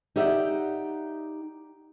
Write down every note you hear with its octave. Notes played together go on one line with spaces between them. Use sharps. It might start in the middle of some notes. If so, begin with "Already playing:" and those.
D#4 G4 D5 E5 F#5